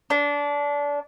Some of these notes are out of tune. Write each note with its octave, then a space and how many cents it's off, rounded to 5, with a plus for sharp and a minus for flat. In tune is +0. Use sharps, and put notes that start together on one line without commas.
D4 -25